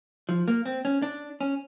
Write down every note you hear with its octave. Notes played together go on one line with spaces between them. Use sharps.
F3
A#3
C4
C#4
D4
C#4